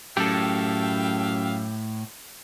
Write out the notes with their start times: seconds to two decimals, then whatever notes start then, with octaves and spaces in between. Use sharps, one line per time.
0.17 F#2 A2 G4 A4 E5 F5 G5